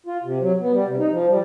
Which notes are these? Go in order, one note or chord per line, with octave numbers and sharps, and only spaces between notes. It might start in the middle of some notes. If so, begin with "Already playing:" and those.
F4
C3
F#3
B3
G3
C3
D#4
F3
G3